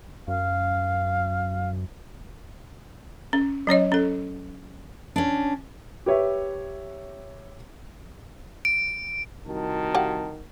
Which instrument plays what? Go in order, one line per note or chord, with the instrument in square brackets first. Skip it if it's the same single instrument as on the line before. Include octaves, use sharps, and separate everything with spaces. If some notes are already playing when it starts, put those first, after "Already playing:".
[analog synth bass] F#2 [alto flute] F5
[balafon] C#4
F#3 C#4 C#5 D#5
C#4 A4
[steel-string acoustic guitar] C#4 D4
[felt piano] G4 B4 C#5 E5
[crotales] D7
[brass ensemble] C2 F#4 A5 [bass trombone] D#3
[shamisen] G4 F5 F#5